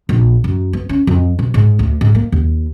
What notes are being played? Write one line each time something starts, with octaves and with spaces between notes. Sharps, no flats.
A#1
F#2
B3
C#4
F2
B2
G#2
D2
G#2
A#3
D#2